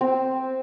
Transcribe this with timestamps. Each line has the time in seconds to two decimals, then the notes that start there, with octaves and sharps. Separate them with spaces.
0.01 C4